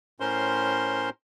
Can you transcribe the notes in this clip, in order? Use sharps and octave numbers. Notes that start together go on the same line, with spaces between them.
A2 C#4 A#4 C5 C6